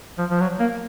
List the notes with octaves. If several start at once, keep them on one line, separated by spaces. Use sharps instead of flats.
F3
F3
F#3
A#3